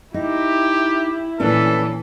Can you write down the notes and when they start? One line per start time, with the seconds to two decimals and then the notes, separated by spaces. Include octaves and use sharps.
0.14 D#4 E4 G4
1.40 A#2 E3 C#4 D4 A4 B4